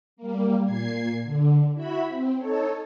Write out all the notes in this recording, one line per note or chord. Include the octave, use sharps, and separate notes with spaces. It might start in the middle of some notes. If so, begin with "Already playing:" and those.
G3 A#3
A#2 G#6 C7
D3
E4 F#4 E5 B5
C4
D#4 A4 C#5